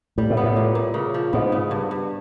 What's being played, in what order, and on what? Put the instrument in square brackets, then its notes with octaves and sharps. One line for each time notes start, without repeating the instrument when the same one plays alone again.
[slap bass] A2 [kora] G3
[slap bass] A2
[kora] B3
[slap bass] A2
[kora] A#2
A#2
C#3
F3
[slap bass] G#2 [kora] B3
[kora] C#3
G2
G2